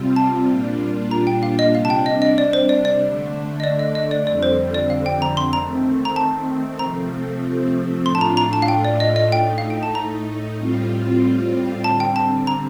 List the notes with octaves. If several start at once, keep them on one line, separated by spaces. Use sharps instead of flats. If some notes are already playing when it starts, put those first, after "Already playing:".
Already playing: C3 G3 C4 F4
A5
A#2 G3 D4 F4
A#5
G5
F5
D#5
C3 G3 D4 F5
A5
G5
D#5
D#5
D5
C5
D5
D5
D3 A3 D4
D#5
D5
D#5
D#5
D5
F2 D3 G3 C4 D5
C5
D5
F5
G5
A#5
C6
D#3 A3 C4 A#5
A#5
A5
C3 F3 A3 C4 A#5
A2 A3 D4 F4 C6
A5
A#5
A#5
A5
F5
G5
D5
D#5
D#5
A2 A3 D#4 G5
F5
G5
A5
A#5
A2 G3 C4 F4
D3 G3 C4 A5
G5
A5
A#5